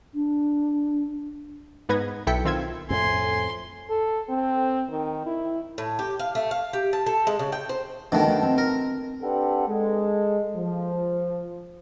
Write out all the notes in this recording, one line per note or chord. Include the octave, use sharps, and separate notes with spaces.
D4
G#2 B3 B4 G#6 A#6
B1 E4 A4 G5 B6 C#7
D#3 C4 F4 E6 G#6
F2 A2 G#5 C6
A4
C4
D#3
E4
A2
G4
F5
A3
F5
G4
A5
A4
G#3
C#3
G5
C5
B2 D3 D#3 A3 D4
A3 D4 G5
C4
A#4
C4 D4 G4 A4 B4 F#5
G#3 A4
F3